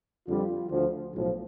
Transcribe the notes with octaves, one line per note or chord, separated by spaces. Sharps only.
F2 D3 G3 F4
D2 D3 F3
B1 A2 F3